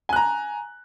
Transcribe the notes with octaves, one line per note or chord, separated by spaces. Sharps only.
G#5 A#5 F#6